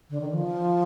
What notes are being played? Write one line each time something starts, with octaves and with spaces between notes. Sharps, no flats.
D3
D#3
F3